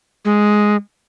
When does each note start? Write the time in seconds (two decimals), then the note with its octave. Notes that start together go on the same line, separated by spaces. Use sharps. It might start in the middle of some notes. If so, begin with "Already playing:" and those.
0.25 G#3